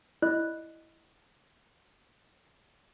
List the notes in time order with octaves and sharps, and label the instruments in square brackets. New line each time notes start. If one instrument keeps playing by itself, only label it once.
[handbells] E4 D5 D#5 F#6